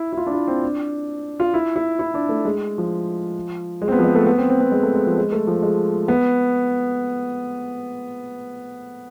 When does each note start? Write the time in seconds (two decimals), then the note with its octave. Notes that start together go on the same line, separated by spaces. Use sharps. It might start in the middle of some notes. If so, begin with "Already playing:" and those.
Already playing: E4
0.13 E4
0.17 F4
0.27 D4
0.32 E4
0.48 C4
0.62 D4
1.40 F4
1.54 E4
1.76 E4
1.99 E4
2.14 D4
2.29 A3
2.45 G#3
2.78 F3
3.82 G#3
3.88 C4
3.92 B3
3.99 F3
4.04 G#3
4.15 A3
4.27 B3
4.38 C4
4.50 C4
4.60 B3
4.71 G#3
4.83 A3
4.95 G#3
5.07 F3
5.18 G#3
5.32 A3
5.47 F3
5.62 G#3
6.08 B3